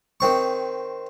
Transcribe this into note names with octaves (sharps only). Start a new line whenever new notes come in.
D#3 C4 C#6